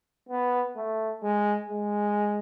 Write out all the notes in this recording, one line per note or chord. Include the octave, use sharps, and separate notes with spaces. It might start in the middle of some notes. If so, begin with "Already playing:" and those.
B3
A3
G#3
G#3